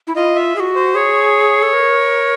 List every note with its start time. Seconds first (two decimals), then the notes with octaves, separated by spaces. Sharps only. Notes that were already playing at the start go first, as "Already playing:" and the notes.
0.07 E4
0.16 F4 D#5
0.36 E5
0.56 G#4
0.60 F#4
0.75 C5
0.95 G#4 C#5
1.63 A4
1.73 A#4